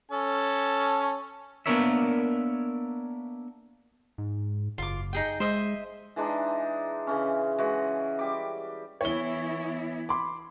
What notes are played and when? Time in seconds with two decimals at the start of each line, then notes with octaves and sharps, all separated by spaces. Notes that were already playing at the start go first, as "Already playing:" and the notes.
0.11 C#4 A4 A5
1.66 A#3 B3 D4 A#4 C#5 E5
4.18 G#2
4.78 F#1 F4 D6
5.13 D#4 G#4 G5
5.40 G#3 C5 D#5 E5
6.16 E3 G#3 D4 D#4
7.07 C#3 E3 C#4
7.59 E3 G#3 F#4
8.19 G3 G4 D6
9.01 E3 B3 E4 C#5 G7
10.09 B5 C6 D6